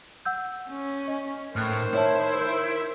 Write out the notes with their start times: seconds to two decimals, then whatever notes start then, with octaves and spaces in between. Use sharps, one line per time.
0.25 F#5 E6 G6
0.69 C#4
1.08 D#5
1.56 A2 D#3 C5 F6 F#6
1.94 E4 C#5 E5 A5
2.37 A#4 G6